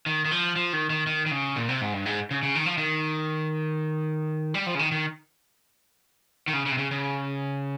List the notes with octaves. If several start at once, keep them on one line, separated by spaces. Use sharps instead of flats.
D#3
D#3
F3
F3
D#3
D#3
D#3
D#3
C#3
A#2
C3
G#2
G2
G#2
C#3
C#3
D#3
F3
D#3
G3
F3
C#3
D#3
D#3
D#3
C#3
C#3
C3
C#3
C#3